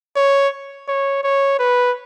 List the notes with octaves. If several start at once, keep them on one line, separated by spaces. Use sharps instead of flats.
C#5
C#5
C#5
B4